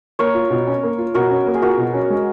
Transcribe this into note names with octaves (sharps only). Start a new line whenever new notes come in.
A#3 A#4 C#5
F4
B2
C#4
A#3
F4
B2 F#4 A#4
C#4
A#3
G#4
F4 F#4 A#4
B2
C#4
G#3